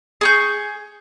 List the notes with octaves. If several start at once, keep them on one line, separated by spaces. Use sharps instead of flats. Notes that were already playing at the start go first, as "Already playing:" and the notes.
G#4 C#6 G6